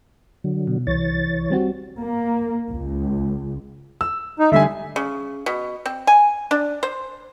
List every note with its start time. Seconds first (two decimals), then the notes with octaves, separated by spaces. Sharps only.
0.44 D3 F#3
0.67 B2
0.87 C2 E3 C#5 A6
1.50 G3 C4 F#4
1.99 A#3
2.70 C#2
4.01 E6
4.39 D#4
4.52 D3 G3 E5 G#5
4.96 C#3
5.46 B2
5.86 C4
6.07 G#5
6.51 D4
6.83 C5